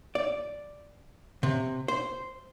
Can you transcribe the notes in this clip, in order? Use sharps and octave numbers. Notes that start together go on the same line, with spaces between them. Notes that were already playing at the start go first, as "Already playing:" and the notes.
D5
C3
C5